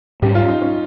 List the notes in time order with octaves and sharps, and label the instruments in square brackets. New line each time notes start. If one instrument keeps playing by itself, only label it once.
[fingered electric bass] G#2 G3 C#4 [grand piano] G4
[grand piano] F4
D#4
C#4